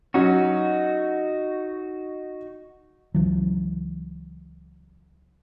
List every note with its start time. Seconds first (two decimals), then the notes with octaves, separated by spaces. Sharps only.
0.14 F#3 C#4 D#4 F#4
3.14 C#2 E3 F#3